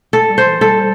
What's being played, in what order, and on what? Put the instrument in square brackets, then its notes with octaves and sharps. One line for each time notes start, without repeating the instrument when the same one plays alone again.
[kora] A4
[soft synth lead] G3
[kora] C5
[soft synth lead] E3
[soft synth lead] G3 [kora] A4